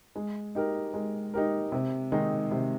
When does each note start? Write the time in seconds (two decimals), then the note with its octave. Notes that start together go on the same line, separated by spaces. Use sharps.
0.16 G#3
0.55 D#4 G4 A#4
0.94 G#3
1.34 D#4 G4 A#4
1.72 C3
2.12 D#3 G#3 D#4
2.51 C3